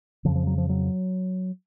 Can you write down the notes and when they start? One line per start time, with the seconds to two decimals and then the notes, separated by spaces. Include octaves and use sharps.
0.25 C#3 F3
0.28 F2
0.36 F3
0.47 F#3
0.58 F3
0.69 F#3